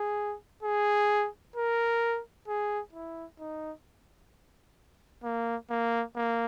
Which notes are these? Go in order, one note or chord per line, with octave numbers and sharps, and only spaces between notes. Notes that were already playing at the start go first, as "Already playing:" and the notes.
Already playing: G#4
G#4
A#4
G#4
E4
D#4
A#3
A#3
A#3